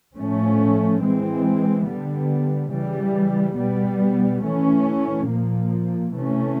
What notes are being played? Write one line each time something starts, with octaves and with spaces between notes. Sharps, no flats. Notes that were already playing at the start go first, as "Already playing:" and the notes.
A2 F3 A3 C#4
E3 G#3 C4
D3 G3 B3
C#3 E3 G3
B2 G3 B3
E3 A3 C#4
A#2 F3 A#3
C3 E3 A3 C#4